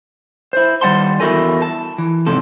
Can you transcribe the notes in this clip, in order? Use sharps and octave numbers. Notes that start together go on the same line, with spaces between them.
E4 C5
D#3 G3 D5 F#5 A5 C6
E2 E4 F#4 A4 A#4 G#5
A5
E3
F2 G#2 C3 A4